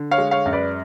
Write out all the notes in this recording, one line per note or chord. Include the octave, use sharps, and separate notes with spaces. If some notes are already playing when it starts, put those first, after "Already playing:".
Already playing: D3
C#5 F5
G#3
C#5 F5
F#2
B4 D5